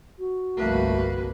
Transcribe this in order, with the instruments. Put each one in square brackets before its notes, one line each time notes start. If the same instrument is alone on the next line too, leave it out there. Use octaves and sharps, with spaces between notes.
[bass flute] F#4
[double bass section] G1 C2 [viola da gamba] F2 A#3 B4 [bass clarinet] A3